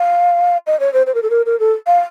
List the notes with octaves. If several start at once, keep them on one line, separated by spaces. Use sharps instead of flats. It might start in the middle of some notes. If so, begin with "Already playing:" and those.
Already playing: F5
D#5
C#5
C5
C5
A#4
A4
A#4
A#4
A4
F5